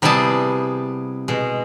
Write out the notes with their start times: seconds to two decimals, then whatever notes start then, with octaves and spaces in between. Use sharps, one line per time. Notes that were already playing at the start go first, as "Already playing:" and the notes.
0.02 C3 G3 B3 E4 G#4 A5
1.28 B2 G#3